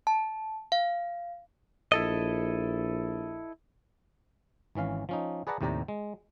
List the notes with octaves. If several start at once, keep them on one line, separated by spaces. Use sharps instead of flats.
A5
F5
A#1 E4 A4 D#5
G#1 E3 C#4 F5
F3 C#4 D#4
G#4 B4 D5 F#5 A5 A#5
D#2 A2 C3 G4 D5 A#5
G#3